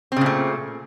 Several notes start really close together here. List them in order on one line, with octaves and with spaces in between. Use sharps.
C4 C#3 A#2 A3